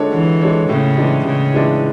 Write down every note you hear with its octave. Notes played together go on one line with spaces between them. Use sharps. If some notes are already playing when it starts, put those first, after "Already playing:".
Already playing: D3 G#3 D4 A4 C#5
D3 E3
G#3 D4 A4 C#5
A2 C#3
E3 G#3 D4
A2 C#3
E3 G#3 D4